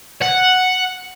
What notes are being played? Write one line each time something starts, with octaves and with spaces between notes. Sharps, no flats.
F#5